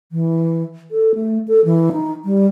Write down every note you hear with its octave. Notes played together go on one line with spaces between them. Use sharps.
E3
A4
A3
A4
E3
D#4
G3